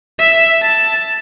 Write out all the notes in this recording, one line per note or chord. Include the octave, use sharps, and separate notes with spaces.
E5
A5